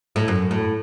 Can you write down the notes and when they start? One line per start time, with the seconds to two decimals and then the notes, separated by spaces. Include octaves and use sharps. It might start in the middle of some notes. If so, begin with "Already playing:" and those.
0.16 A2
0.28 F#2
0.51 A2